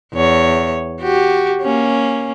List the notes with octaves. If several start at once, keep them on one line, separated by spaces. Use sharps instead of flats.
E2 C#5
F#4 G4
A#3 C#4